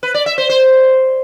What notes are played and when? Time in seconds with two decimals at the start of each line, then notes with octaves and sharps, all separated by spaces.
0.03 B4
0.14 D5
0.26 E5
0.38 C5
0.49 C5